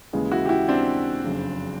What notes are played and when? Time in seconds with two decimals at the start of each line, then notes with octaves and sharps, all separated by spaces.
0.13 D#2 C#3 E3 G#3
0.31 E4 F#4
0.46 G4
0.49 E4 F#4
0.68 C4 D4
1.24 F#1 F2 C#3